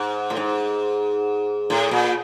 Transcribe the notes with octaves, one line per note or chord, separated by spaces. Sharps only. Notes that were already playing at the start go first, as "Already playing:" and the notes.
Already playing: G#2
A2
G#2
A2
A#2